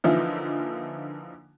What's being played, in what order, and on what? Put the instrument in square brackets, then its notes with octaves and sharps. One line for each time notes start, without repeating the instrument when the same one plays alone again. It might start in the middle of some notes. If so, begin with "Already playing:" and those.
[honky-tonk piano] D3 E3 F3 A#3 D#4 E4